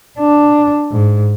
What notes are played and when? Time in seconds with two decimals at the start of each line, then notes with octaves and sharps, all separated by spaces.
0.19 D4
0.92 G#2